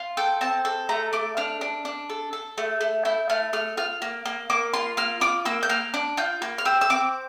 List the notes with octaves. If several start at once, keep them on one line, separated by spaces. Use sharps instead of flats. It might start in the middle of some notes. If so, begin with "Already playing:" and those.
Already playing: F4
A4 G5
C4 A5
A4
A3 A#5
A3 D6
D4 F6
D4
D4
A4
A4
A3
A3
E4 G6
A3 F6
A3 F6
F4 F6
A#3
A#3
A#3 D6
F4 C6
A#3 F6
F4 D6
A#3 E6
G6
A#3 F6
D4
F4 G6
A#3
F6
G4 E6
E6
C4 D6